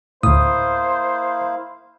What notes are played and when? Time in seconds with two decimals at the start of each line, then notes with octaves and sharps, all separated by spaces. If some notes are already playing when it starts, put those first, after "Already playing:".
0.23 D2 A2 A#3 E4 C5 F5 D#6